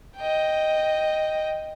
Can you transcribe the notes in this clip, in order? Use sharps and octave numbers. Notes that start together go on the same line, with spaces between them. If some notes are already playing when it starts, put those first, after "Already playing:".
D#5 G5